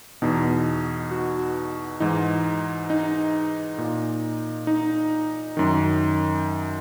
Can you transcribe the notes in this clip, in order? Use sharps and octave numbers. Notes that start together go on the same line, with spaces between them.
E2 B2 D#4
F#4
G#2 E3 D#4
D#4
A#2
D#4
F#2 D#3